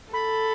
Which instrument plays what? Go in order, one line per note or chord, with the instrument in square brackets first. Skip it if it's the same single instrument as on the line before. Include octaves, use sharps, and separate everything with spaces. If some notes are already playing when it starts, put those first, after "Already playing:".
[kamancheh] A4 [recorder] B5